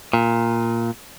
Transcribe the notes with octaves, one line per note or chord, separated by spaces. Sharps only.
A#2